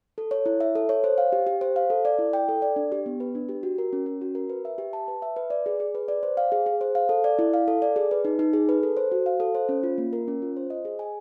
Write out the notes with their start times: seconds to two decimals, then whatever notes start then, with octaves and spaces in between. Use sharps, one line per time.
0.18 A4
0.31 C#5
0.46 E4
0.60 E5
0.75 A4
0.89 C#5
1.04 C5
1.18 F5
1.32 G4
1.47 G4
1.61 C5
1.76 F5
1.90 A4
2.05 D5
2.19 E4
2.33 G5
2.49 A4
2.62 D5
2.76 D4
2.92 G4
3.06 B3
3.20 B4
3.35 D4
3.49 G4
3.63 F#4
3.78 A#4
3.93 C#4
4.06 C#4
4.22 F#4
4.35 A#4
4.50 B4
4.65 E5
4.78 G4
4.93 A5
5.08 B4
5.22 E5
5.36 B4
5.50 D5
5.66 G#4
5.80 G#4
5.95 B4
6.08 D5
6.23 C5
6.37 F5
6.52 G#4
6.66 G#4
6.81 C5
6.95 F5
7.09 A4
7.24 D5
7.39 E4
7.54 F5
7.68 A4
7.82 D5
7.96 G#4
8.11 B4
8.25 D#4
8.39 D#4
8.53 G#4
8.69 B4
8.83 A4
8.97 C5
9.12 F#4
9.26 F5
9.40 A4
9.55 C5
9.69 C#4
9.83 F4
9.98 A#3
10.13 A#4
10.28 C#4
10.42 F4
10.57 C5
10.70 D#5
10.85 G#4
10.99 G#5